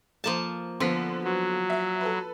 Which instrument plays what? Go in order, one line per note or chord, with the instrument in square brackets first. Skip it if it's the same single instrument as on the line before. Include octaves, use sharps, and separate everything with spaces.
[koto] F3 A#3 A5
[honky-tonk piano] D3 B3 B6 [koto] F3
[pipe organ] F#3
[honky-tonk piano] E5
A4 B4